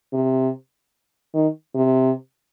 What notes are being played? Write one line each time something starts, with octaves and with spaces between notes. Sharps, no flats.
C3
D#3
C3